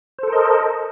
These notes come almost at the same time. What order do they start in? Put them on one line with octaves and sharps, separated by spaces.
C5 A4 A#4 D#5